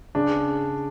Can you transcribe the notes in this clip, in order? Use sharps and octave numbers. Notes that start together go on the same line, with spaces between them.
C#3 D4